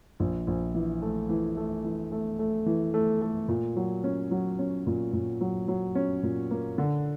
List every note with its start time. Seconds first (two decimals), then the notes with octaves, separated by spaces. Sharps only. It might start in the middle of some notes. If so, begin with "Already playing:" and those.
0.20 A#1
0.47 A#1
0.75 E3
1.02 A3
1.29 E3
1.57 A3
1.84 E3
2.12 A3
2.39 A3
2.66 E3
2.94 A3
3.22 A3
3.48 A#2
3.76 F#3
4.04 C#4
4.31 F#3
4.59 C#4
4.87 A#2
5.13 A#2
5.41 F#3
5.68 F#3
5.95 C#4
6.23 A#2
6.51 A#3
6.78 D3